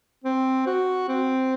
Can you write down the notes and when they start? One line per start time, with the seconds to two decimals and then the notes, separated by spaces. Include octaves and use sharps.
0.24 C4
0.66 F#4
1.08 C4